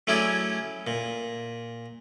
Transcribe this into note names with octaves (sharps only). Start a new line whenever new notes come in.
F#3 A3 C#4 E4 G#4 D5
A#2